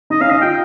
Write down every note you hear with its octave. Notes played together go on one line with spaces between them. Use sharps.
D#4 D#5
C#4 F5
D#4 D#5
F4 G5